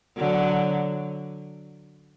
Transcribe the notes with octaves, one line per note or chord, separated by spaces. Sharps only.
D3 F#3